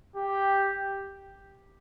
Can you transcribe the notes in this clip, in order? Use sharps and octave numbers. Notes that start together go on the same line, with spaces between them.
G4